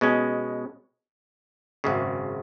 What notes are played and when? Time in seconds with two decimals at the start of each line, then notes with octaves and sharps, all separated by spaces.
0.01 B2 G#3 C#4
1.84 G#1 F#2 C#3